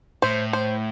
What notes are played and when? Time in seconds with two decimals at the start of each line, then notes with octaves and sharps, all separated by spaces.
0.22 A2 C5
0.53 C5